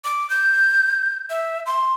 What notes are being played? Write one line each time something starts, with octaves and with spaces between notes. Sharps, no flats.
D6
G6
E5
C6